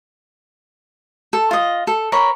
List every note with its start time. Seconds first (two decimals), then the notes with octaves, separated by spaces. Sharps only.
1.33 A4
1.51 F4 D#5
1.87 A4
2.12 A#4 C#5 B5